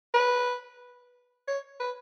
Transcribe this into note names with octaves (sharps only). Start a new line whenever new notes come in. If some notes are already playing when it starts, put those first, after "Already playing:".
B4
C#5
B4